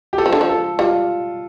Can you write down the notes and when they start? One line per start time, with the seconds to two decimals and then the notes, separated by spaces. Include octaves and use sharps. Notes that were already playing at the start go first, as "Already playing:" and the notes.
0.13 G4
0.18 G3 A4
0.26 F3
0.33 D3
0.41 F3
0.49 A4
0.79 G3 F4